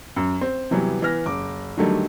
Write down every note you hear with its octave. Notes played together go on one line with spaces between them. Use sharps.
F#2
C4
C3 E3 F#3 G3 B3
E3 B3 F6 A#6
F#1 D6
D3 D#3 F#3 G3 A3